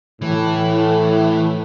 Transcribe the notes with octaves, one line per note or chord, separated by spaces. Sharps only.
A2 E3